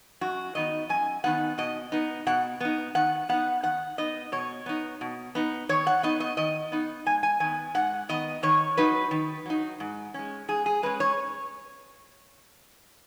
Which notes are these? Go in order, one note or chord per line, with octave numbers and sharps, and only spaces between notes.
F#2 F#4
D#3 B3 D#4 D#5
F#2 G#5
D#3 B3 D#4 F#5
B2 D#5
B3 D#4
B2 F#5
B3 D#4
D#3 F#5
B3 D#4 F#5
D#3 F#5
B3 D#4 D#5
B2 C#5
B3 D#4
B2
B3 D#4
D#3 C#5
F#5
B3 D#4 D#5
D#5
D#3 D#5
B3 D#4
G#2 G#5
G#5
D#3 B3 G#5
G#2 F#5
D#3 B3 D#5
D#3 C#5
F#3 D#4 B4
D#3
F#3 D#4
G#2
G#3 C#4
G#2 G#4
G#4
G#3 C#4 B4
C#5